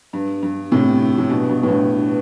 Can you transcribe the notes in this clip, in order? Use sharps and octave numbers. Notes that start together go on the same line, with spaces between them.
G2
G2
A2 C3
A2
G2 B2
G2 B2
A2
G2 B2